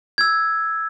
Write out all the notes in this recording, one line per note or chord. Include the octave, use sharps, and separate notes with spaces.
E6 G#6